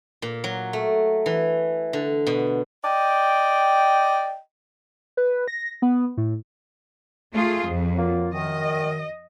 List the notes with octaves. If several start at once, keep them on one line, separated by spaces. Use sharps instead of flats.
A#2
F#3
A3
E3
D3
B2
D5 D#5 G5
B4
A#6
B3
A2
A3 F4 G#4
F2
F#3 A#3 F4
F#2 D#3 D#5